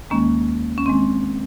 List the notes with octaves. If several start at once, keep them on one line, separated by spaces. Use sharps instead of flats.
D#2 D#3 G#3 A#3 C#4
C#4
D#3 G#3 C4